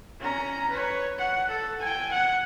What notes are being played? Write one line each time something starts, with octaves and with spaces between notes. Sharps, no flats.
C#4 A#5
B4 C#5
F#5
A4
G5 G#5
F#5